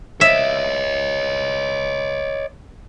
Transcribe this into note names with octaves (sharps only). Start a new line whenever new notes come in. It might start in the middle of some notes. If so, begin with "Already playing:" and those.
C#5 D#5 E5